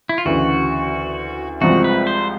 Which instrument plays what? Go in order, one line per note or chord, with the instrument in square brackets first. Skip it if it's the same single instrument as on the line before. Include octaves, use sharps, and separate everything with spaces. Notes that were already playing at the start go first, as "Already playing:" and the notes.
[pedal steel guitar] E4
F4
[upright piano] D2 C#3 E3 [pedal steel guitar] F#4
[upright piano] C2 C3 F3 G#3 C4 [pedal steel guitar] F#4
[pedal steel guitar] B4
C5